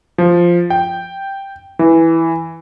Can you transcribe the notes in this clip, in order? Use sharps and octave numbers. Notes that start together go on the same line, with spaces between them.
F3
G5
E3